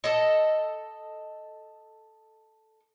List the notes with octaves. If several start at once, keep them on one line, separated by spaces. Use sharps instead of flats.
A4 D#5